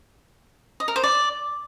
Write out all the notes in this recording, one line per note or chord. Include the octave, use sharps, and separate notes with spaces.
D#5
A#4
C5
D5